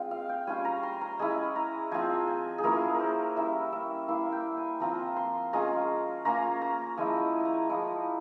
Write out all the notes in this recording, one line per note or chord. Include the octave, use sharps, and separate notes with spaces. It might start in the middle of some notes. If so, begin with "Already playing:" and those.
Already playing: G#3 C4 F4 G5
F5
G5
G3 C#4 F4 G#5
A#5
C6
A#5
G#3 C#4 E4 G#5
A#5
F3 C4 F4 G#5
G#5
G#4
F3 A#3 C#4 E4 A#4
A#4
C5
G3 C#4 E4 E5
E5
A#3 E4 F5
G5
G#5
F3 C4 F4 A#5
C6
G#3 C#4 F4 A#5
A#3 C#4 F4 A#5
A#5
F3 G#3 E4 G#5
G#5
A#5
F3 G#3 E4